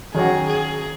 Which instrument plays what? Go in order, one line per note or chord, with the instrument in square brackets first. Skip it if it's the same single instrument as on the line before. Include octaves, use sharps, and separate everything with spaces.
[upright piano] D#3 F#3 C#4 F#4 [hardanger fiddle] G#4
[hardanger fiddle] G#4